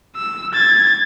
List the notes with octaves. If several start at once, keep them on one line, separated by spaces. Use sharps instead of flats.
E6
G#6 A6